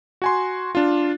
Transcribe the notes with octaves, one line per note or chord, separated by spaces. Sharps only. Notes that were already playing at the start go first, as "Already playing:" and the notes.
F#4 G#5 C6
D4 F4